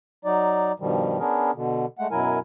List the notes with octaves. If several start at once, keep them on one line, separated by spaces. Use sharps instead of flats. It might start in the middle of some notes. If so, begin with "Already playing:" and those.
F#3 D#4 D5
G2 B2 D#3 F3 G3
B3 C#4 D4 G#4 A#4
B2 D3
G#3 A3 F#5
F#2 B2 F#3 E4 A#4 G#5